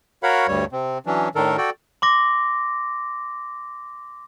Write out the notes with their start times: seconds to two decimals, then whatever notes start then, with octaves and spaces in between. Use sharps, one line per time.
0.23 F#4 A#4 C#5 F5 F#5 B5
0.48 D2 G2 G3 C#5
0.72 C3 C4
1.06 E3 F#3 C#4 D4
1.35 A2 D#3 D4 A4 A#4
1.57 F#4 A4 D5 G5
2.02 C6 D6 A#6